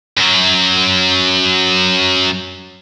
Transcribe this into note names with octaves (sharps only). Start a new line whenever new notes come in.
F#2 F#3